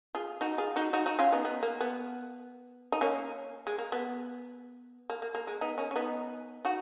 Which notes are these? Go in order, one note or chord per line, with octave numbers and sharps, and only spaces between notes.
F4 G#4
D#4 F#4
F4 G#4
D#4 F#4
D#4 F#4
D#4 F#4
C#4 F4
B3 D#4
B3
A#3
B3
D#4
A#3 C#4
G#3
A#3
B3
A#3
A#3
A#3
G#3
B3 D#4
A#3 C#4
C#4
B3 D#4
D#4 F#4